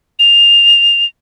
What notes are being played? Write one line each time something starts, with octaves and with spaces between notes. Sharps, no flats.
F7